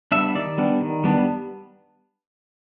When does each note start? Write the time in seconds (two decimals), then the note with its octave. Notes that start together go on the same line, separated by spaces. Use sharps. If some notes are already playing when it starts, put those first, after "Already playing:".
0.12 G3 B3 D4 E5
0.35 D#3 D5
0.58 G3 B3 D4
0.80 D#3
1.04 G3 B3 D4